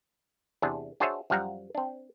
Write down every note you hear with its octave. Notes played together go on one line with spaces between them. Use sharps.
E2 C3 D4 G#4
D4 F#4 G#4 C5 C#5 E5
F#2 F3 G3 F5 F#5 A#5
C4 D4